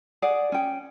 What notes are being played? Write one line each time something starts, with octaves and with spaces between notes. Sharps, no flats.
G#4 D5 F#5
C#4 G5